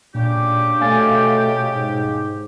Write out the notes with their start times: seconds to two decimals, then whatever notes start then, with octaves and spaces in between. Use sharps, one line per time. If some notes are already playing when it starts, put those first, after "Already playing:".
0.15 A#2 C#3 D4 G4
0.81 B2 A3 F5 G#5 A6
1.74 G#2